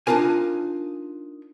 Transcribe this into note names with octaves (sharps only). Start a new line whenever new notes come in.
D4 D#4 F4 A#4 G#5